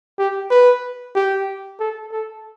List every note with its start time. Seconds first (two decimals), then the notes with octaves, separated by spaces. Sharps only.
0.19 G4
0.51 B4
1.15 G4
1.80 A4
2.12 A4